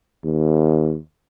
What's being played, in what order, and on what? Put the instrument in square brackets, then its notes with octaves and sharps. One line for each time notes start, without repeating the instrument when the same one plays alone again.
[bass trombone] D#2